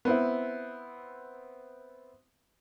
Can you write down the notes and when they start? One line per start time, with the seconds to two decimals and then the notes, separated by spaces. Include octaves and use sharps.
0.05 B3 C4 E4